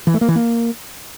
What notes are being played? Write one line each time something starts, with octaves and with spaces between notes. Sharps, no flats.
E3
A3
A#3
E3
A#3